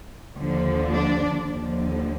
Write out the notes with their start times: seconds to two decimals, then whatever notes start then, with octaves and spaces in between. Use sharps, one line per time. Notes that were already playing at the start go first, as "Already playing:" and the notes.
0.37 D#2 D3 F3
0.91 D4 D5
1.47 D#2 D3 F3